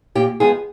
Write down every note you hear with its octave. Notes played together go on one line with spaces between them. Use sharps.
A#2 G4
F3 G#3 B3 G#4